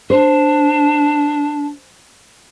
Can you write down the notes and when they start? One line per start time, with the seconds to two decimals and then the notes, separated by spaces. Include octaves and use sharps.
0.10 D4 C5